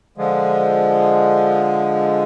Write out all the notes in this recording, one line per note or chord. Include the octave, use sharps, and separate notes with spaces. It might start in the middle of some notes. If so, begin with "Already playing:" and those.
D3 F3 G#3